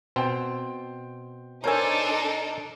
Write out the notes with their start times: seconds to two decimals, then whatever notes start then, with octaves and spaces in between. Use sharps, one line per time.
0.16 B2 C4 G5 C6
1.64 D4 D#4 A4 A#4 C5 C#5 G#5 E6